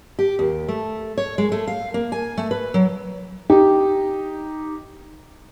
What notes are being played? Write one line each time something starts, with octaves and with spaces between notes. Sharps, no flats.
G4
D#2
A3
C#5
G#3
A3
F5
A#3
G#5
A3
B4
F#3
D#4 G4